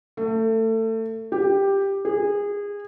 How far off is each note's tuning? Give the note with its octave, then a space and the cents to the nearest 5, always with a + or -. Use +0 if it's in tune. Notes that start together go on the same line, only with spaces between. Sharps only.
A3 +25
G4 +5
G#4 -25